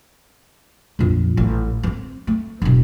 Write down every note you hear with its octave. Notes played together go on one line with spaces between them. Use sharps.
A#1 F2
A1
B3 C4
A3
E1 B2